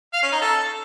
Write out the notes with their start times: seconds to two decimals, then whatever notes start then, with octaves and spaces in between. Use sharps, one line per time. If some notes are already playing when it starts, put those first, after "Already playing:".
0.13 F5
0.22 C#4
0.32 D#4
0.41 A4